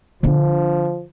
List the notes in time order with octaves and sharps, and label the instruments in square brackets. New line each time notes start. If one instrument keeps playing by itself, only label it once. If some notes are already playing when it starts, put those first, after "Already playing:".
[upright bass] D3 D4 [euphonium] F3